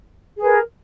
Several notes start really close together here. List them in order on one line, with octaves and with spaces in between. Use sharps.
G#4 B4 A#4